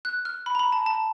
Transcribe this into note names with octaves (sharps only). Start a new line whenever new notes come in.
F#6
F6
B5
A#5
B5
A5
A5